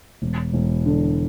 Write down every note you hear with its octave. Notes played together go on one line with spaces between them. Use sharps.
E1
E1
D3